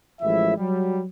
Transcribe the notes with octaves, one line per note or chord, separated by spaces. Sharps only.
A1 F3 G#3 E4 E5
F#3 G3